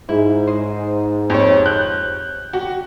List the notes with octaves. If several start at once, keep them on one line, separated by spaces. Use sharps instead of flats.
G#2 E4
C5 D#5
F2 G4 C5 C#5
F#6 G6
F#4 G4